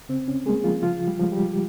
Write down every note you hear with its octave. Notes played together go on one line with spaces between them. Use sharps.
C#3 C4
C#4
G3 G#3 A#3 G#4
F3 F4
C#3 F3 F4
G3 G4
F3 G#3
G3 G4